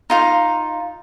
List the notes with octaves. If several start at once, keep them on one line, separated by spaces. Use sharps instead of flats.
D#4 F4 F5